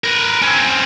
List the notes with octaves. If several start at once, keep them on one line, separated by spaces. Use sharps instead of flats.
A#4 B4
C4 C#4